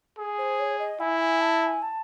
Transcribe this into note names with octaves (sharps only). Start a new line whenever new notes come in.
G#4
C5
C#5
D#5
E4 G#5
G#5
A5
A5
G#5
A5